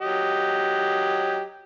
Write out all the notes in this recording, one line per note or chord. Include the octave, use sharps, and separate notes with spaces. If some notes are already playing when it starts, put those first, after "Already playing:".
F#3 G4 D#5